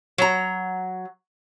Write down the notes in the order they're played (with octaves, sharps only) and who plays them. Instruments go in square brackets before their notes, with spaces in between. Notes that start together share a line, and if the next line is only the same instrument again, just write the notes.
[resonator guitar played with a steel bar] F#3 A#5